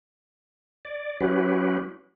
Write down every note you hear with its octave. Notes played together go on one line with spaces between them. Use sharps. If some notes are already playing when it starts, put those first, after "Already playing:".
D5
F#3 C#4 E4 F#4 G4 B4